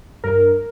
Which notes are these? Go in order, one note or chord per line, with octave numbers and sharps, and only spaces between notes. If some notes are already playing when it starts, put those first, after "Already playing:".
G2 A#4